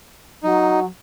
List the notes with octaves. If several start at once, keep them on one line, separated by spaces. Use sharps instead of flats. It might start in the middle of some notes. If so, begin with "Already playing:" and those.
F#3 D#4